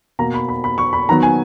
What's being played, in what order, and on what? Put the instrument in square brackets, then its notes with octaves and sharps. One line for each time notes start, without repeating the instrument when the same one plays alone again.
[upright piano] B2 A#3 A#5
B5
B5
B5
C#6
B5
D#3 F#3 B3 A#5
G#5